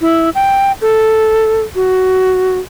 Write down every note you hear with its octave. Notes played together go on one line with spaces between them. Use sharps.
E4
G5
A4
F#4